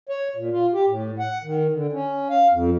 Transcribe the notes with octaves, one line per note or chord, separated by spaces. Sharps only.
C#5
A#2
F4
G4
A2
F#5
D#3
D3
C#4
F5
F2